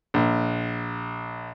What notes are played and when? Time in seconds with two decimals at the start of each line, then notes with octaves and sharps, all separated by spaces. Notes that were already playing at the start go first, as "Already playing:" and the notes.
0.14 A#1